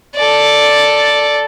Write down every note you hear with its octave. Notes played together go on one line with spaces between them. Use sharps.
A4 D5